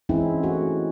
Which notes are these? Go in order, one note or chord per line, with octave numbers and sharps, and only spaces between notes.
E3 G#3 C4 C#4 D#4 E4
A3 F#4